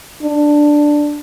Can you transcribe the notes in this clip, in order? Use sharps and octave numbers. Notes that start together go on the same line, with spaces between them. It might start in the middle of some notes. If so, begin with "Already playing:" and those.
D4